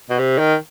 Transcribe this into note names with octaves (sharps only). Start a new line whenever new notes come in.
B2
C3
D#3